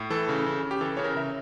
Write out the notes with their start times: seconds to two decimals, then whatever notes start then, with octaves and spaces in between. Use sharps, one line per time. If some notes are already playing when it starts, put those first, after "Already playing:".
Already playing: A2
0.10 E3 A4
0.29 C#3
0.46 C#3
0.63 C#3
0.71 G4
0.81 E3 A4
0.97 C#3 C#5
1.04 A#4
1.15 C#3 E5